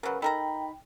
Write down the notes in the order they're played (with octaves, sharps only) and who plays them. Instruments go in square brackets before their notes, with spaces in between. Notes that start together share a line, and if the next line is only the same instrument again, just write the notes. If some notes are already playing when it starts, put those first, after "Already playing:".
[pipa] C#3 F#3 [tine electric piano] A#4 B4
[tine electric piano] D#4 B5 [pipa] A4 A#4 A#5 [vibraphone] G5